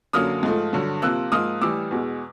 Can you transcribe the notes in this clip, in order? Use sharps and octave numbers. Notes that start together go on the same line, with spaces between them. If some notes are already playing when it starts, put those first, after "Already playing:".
F#2 D3 F#3 A#3 D#6 F6
G#2 F3 A3
G2 D3 F#3
C3 F3 A#3 E6 F#6
G#2 F3 A#3 D#6 F6
A2 E3 G3 D6 E6
E2 B2 G#3